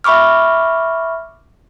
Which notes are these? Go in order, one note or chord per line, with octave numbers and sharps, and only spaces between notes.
E5 B5 C#6 D6 F6